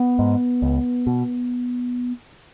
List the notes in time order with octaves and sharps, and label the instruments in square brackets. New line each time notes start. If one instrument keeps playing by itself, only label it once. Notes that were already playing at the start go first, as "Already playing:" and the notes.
Already playing: [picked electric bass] B3
G#2
C#2
B2